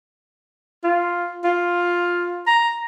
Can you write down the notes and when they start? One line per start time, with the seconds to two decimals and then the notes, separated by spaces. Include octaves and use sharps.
0.84 F4
1.44 F4
2.47 A#5